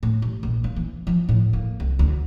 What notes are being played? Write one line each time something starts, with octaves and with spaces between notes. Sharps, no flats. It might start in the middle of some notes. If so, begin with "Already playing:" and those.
A2
A1
A#1
A#3
E3
F3
A2
A#3
C2
D2